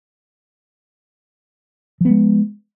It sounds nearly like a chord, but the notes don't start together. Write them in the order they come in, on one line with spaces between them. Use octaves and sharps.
F3 B3 G#3